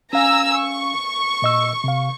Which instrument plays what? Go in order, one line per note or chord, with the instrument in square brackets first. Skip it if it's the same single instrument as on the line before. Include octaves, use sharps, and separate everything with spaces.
[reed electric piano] C#4 F5 [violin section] G#5 A#5 E6
[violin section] C#6
[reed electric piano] A#2 D#5 E6
C3 F5